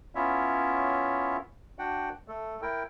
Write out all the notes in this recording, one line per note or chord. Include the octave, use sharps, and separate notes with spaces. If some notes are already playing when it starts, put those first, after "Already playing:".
B3 C#4 E4 F4 C#5 E5
D4 F#4 F#5 G5
A3 A4
E4 A#4 G5